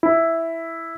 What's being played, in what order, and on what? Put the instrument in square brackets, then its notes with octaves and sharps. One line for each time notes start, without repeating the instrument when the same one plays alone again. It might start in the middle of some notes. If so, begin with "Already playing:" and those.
[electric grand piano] E4